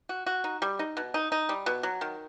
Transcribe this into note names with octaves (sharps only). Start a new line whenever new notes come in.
F#4
F#4
D#4
G3
D#4
B2
D#4
D#4
G3
B2
F#3
D#3